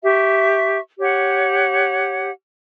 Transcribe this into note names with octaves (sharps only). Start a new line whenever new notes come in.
G4 E5 C#6
G4 C#5 F#5